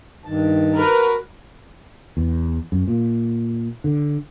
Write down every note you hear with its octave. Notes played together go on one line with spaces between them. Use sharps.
G2 D#3 A5
F#4 A#4 B4
E2
F#2
A#2
D3